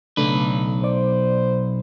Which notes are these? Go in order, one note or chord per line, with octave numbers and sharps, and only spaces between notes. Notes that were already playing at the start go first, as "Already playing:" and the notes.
B1 C#3 A3 D4 B4
C5 D5